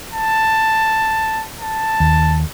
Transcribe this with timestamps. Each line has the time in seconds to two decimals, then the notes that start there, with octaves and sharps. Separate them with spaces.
0.13 A5
1.61 A5
2.00 D#2